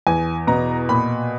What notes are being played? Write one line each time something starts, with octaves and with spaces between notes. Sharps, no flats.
E2 G#5
B2 A#5
A#2 B5